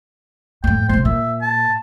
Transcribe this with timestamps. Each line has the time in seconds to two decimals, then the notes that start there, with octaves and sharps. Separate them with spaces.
0.64 F2 A2 G5
0.89 D2 C3 C5
1.05 A#2 E5
1.42 A5